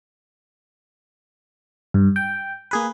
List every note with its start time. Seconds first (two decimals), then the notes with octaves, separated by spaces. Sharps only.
1.94 G2
2.16 G5
2.71 A#3 G#4 B4